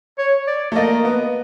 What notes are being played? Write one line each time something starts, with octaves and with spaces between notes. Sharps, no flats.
C#5
D5
A3
A#3 D#5
B3